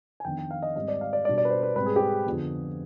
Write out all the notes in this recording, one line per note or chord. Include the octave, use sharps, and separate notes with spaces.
G#5
F2 D#3 B3 D4 G5
G5
F5
D#5
G#2 G3 C4 D#5
D5
F5
D5
B2 G3 D4 D5
D5
B4
C5
B4
G#2 G3 C4 B4
G#4
G4
G#4
F2 D3 F3 B3